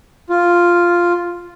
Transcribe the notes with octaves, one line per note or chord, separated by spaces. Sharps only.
F4